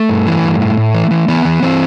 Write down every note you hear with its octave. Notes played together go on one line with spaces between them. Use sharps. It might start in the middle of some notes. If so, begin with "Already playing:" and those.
Already playing: A3
G2
E3
G2
A2
A2
E3
E3
E3 B3
E3
E3 C4